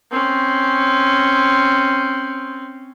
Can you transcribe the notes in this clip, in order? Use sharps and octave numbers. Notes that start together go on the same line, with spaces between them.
C4 C#4